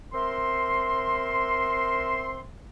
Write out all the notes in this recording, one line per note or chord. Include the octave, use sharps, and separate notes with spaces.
C4 A#4 E5 C6